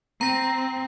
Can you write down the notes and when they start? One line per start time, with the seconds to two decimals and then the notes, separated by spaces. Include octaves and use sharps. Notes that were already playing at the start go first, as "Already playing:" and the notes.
0.21 C4 A#5 A#6